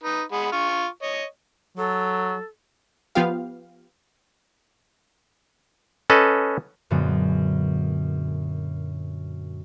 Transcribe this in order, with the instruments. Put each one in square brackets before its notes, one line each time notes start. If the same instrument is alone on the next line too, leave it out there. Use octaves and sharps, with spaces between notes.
[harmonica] D#4 B4
G#3 F#5 B5
F4 C#6 F6
C#5 D#5
[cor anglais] F#3 [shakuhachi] A4
[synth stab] F3 B3 F4 G4 F5
[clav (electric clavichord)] C#4 A4 B4 D#5
[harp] F#2 A#2 D3 F#3 G#3 B3